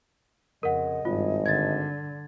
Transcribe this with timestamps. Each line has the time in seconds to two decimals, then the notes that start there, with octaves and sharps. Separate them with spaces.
0.63 F2 C#3 A#4 D#5 F#5
1.05 G#1 G2 F4
1.46 D3 G#6 A6